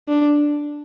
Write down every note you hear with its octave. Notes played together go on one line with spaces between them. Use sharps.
D4